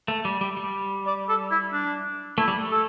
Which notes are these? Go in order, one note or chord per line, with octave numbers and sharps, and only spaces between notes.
A3
G3
G3
G3
D5
A4
E4
D4
A3 E4
G3
A3
A4